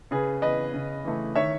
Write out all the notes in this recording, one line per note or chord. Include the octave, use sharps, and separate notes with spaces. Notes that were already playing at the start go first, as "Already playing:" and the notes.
C#3 G#4 B4
E3 B3 B4 D#5
C#3
E3 A3
D#3 C#5 E5